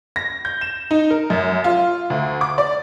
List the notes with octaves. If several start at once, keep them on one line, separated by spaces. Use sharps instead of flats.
A#6
G6
E7
D#4
A#4
F#2
F4
D2
D6
D5